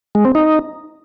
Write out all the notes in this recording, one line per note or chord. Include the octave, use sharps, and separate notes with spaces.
G#3
C4
D#4